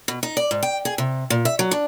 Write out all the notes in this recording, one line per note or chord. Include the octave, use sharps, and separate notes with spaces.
B2
D#4
D5
G#2
G5
G#4
C3
A#2
E5
F#3
D4